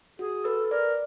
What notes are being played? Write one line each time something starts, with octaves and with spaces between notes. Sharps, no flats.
F#4 G#4
A4 B4
A4
A#4 D5